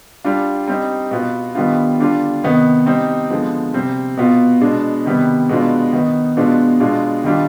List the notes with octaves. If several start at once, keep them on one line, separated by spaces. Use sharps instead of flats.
G3 D4 F4
G3 C4 D#4
B2 B3 F4
D#3 G3 B3 D4 F4
D3 G3 D4 F4
C3 D#3 B3
G3 C4 D#4
D3 F3 G#3 B3
C3 G3 C4
B2 B3 F4
B2 G#3 D4
C3 D#3 G3 B3
B2 G#3 B3 D4 F4
D#3 B3 D#4
B2 G#3 B3 D4 F4
B2 G#3 D4 F4
D#3 G3 D4 F4